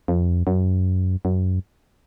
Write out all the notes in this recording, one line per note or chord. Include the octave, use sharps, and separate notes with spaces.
F2
F#2
F#2